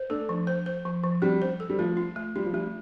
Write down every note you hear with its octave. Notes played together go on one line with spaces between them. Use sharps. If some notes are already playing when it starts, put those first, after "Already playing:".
Already playing: C5
A3 D4 A4
F3
C5
C5
F3
F3
G3 C4
C5
A4
G3
F3 A3
F4
A3
G3 F4
F3
G3 A3